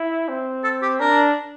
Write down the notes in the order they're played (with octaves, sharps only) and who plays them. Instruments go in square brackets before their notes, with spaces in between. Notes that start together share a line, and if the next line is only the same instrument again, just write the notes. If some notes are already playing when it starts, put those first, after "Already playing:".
Already playing: [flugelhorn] E4
C4
[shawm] A4
G4
[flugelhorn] D4 [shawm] A#4